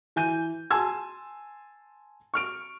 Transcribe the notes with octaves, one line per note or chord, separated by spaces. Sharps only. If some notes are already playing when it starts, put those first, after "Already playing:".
E3 G#5 G6 D#7
G#5 A5 C6 E6 G#6
C#6 F6 D7